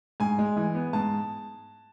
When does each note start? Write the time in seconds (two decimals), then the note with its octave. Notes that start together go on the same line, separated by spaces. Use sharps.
0.20 G#2 G#5
0.38 G#3
0.57 E3
0.75 B3
0.93 G#2 A5